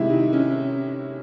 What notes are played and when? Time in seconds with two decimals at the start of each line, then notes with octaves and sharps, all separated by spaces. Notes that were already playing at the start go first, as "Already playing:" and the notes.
Already playing: C3 D#3 G#3 E4
0.10 D#4
0.33 C#4